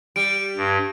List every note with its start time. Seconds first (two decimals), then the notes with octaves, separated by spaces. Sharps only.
0.16 G3 D7
0.57 G2 D7